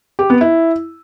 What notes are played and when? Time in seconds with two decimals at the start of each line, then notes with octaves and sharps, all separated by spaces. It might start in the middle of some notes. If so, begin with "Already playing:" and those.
0.19 G4
0.30 B3
0.41 E4